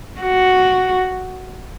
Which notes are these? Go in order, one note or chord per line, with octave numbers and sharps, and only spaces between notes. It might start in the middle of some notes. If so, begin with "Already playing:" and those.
F#4